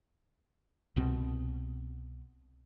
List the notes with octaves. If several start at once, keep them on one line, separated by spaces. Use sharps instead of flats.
C2 B2 C4